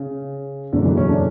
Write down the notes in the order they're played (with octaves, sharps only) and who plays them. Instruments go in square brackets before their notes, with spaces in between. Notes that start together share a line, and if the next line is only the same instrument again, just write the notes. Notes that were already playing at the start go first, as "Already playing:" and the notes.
Already playing: [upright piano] C#3
[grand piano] F#1 E2 B2 F#3 A3 [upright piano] D3
[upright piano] E3
C#4
D4